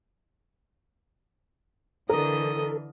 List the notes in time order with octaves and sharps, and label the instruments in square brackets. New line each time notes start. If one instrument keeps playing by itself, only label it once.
[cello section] D3 E3 [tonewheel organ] A4 [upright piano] A#4 [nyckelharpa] D#5 D#6